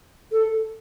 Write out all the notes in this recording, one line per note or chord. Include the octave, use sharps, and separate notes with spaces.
A4